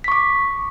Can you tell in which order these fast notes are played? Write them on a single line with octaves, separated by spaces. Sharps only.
B6 C#6 D6